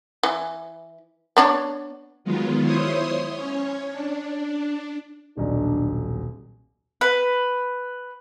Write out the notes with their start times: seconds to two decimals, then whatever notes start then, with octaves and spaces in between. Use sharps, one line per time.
0.23 E3
1.37 B3 D4 C#5
2.24 D#3 F#3 G#3 B3 F4
2.61 E4 C5 C#5 C6 D#6
3.31 C#4 C#5
3.91 D4
5.37 D#1 B1 D4
7.01 B4